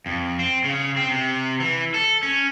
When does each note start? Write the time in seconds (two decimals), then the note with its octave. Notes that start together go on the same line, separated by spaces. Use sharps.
0.06 F2
0.39 C4
0.64 C#3
0.96 C4
1.09 C3
1.60 E3
1.94 A4
2.23 C#4